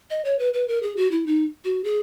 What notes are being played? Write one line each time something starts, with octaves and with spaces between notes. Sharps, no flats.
D#5
C#5
B4
B4
A#4
G#4
F#4
E4
D#4
F#4
G#4